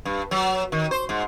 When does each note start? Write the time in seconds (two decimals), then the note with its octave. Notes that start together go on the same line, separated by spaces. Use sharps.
0.05 G2
0.31 F#3
0.72 D#3
0.91 C5
1.09 G#2